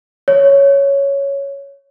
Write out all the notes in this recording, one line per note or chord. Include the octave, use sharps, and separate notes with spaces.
C#5